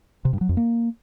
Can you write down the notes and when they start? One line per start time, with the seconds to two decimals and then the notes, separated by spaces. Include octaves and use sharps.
0.25 C3
0.33 G2
0.41 F#3
0.49 F2
0.57 A#3